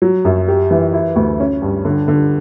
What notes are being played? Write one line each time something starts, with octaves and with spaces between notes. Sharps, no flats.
F#3
F#2
G4
E3
E4
D2
C#4
G2
D3
D3